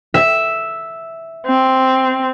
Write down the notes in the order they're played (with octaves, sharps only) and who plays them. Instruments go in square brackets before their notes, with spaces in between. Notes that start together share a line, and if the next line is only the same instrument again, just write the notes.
[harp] E5
[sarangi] C4